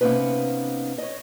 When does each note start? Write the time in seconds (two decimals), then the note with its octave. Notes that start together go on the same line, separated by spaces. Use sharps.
0.01 C3 A#3 B3 C#4 D#4 B4
0.98 C#5 D#5